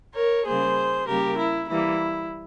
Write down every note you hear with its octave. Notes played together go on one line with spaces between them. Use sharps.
A#4 C#5
C#3 G3 A#3 G#4 C5
C#3 G3 A#3 G4 A#4
E4
E3 G3 A#3 E4